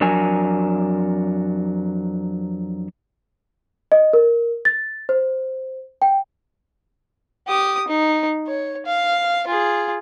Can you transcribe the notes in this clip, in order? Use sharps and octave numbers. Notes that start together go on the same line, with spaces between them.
F2 F#3 D4 A#4 G#5
D#5
A#4
A6
C5
G5
G4 D#6
D#4
C#5
F5
F4 G#4